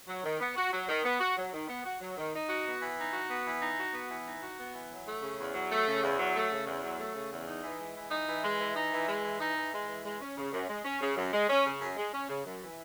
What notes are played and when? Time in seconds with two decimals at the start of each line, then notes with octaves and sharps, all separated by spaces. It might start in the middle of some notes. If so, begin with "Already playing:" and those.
0.08 F#3
0.24 D#3
0.40 B3
0.56 F#4
0.73 F#3
0.89 D#3
1.04 B3
1.20 F#4
1.37 F#3
1.53 D#3
1.68 B3
1.84 F#4
2.01 F#3
2.17 D#3
2.33 D#4
2.49 F#4
2.66 B3
2.82 E3
2.98 D#4
3.13 F#4
3.30 B3
3.46 E3
3.61 D#4
3.78 F#4
3.93 B3
4.09 E3
4.26 D#4
4.41 F#4
4.58 B3
4.74 E3
4.90 F#3
5.06 A3
5.22 C#3
5.38 E2
5.54 F#3
5.71 A3
5.87 C#3
6.02 E2
6.19 F#3
6.35 A3
6.51 C#3
6.67 E2
6.83 F#3
6.99 A3
7.15 C#3
7.32 E2
7.47 D#4
7.63 E3
7.80 G#3
7.95 E3
8.11 D#4
8.28 E3
8.44 G#3
8.59 E3
8.76 D#4
8.92 E3
9.08 G#3
9.24 E3
9.40 D#4
9.56 E3
9.73 G#3
9.88 E3
10.05 G#3
10.21 C#4
10.37 C#3
10.52 F#2
10.69 G#3
10.85 C#4
11.01 C#3
11.16 F#2
11.33 G#3
11.49 C#4
11.66 C#3
11.81 F#2
11.97 G#3
12.13 C#4
12.29 C#3
12.45 F#2
12.62 E3